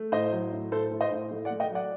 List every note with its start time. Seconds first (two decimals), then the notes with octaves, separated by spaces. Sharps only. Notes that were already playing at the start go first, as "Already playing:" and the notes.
Already playing: A3
0.12 A2 C5 D#5
0.32 F#3
0.52 A2
0.72 A2 A4 C5
0.91 A2
1.01 C5 D#5
1.11 A2
1.31 A3
1.45 D5 F#5
1.51 A3
1.60 D#5 G5
1.70 F#3
1.75 D5 F#5